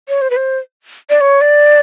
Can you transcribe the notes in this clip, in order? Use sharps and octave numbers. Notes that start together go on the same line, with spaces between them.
C#5
C5
B4
C5
D5
C#5
D5